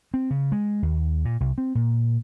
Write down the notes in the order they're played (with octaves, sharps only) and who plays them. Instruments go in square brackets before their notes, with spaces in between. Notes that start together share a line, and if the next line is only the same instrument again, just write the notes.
[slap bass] C4
C#3
G#3
D#2
A#2
C2
C4
A#2